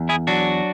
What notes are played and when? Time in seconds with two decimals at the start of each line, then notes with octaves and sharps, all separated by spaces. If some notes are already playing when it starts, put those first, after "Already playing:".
Already playing: E2
0.09 E4 G#4
0.27 F#3 D4 F#4